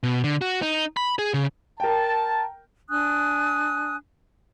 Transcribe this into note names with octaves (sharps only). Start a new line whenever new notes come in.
B2
D3
F#4
D#4
B5
G#4
C#3
A#4 G5 A5
D4 G#5 D#6 F#6